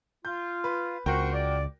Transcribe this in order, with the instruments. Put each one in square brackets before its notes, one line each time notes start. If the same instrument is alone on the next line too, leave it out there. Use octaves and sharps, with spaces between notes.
[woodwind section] F4 [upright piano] G6
[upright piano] B4
[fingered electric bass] C#2 [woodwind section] C4 C5 C#6 [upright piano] F#4 A#4 G5
[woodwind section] D5